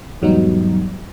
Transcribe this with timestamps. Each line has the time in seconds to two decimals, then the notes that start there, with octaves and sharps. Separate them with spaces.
0.22 E2 G#2 F#3 G3 B3 D#4